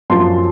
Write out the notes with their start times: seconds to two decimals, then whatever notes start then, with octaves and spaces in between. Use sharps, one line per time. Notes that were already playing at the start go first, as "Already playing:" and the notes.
0.10 F#2 F3 A#3 A5 C6